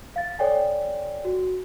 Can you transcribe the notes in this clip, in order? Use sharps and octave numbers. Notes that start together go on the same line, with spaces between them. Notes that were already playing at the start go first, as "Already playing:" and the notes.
F5 A6
A4 C#5 D5 G5 G#5
F#4